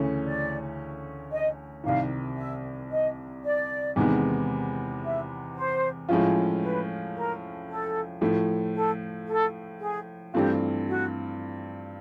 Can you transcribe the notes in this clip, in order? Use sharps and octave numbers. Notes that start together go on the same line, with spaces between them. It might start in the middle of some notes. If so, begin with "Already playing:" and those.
Already playing: D2 C#3 E3 A3 C#4
D5
D#5
C2 C3 D#3 F5
E5
D#5
D5
E2 C3 D#3 G#3 B3
E5
C5
A2 F3 G#3 C#4 F4
B4
A#4
A4
A2 F3 A3
A4
A4
G#4
G2 E3 A3 C4 F4 G4
F#4